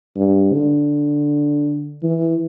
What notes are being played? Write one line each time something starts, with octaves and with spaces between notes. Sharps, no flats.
G2
D3
E3